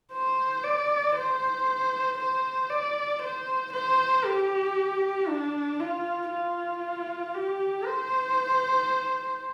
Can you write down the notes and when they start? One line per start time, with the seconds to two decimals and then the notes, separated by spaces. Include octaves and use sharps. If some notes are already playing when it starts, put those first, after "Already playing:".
0.13 C5
0.64 D5
1.15 C5
2.18 C5
2.69 D5
3.22 C5
3.73 C5
4.25 G4
5.28 D4
5.79 F4
6.30 F4
7.35 G4
7.86 C5